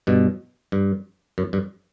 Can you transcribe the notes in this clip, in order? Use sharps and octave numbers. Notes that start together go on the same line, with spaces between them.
G2 B2
G2
F#2
G2